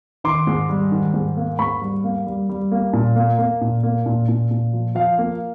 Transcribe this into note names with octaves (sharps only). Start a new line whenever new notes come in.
D#3 C6 D6
G#2
G3
D#3
G#2
A#3
G#2 B5 C#6
G3
A#3
G3
G3
A#3
A#2
A#3
A#3
A#2
A#3
A#2
A#2
A#2
F3
F3 F5
A#3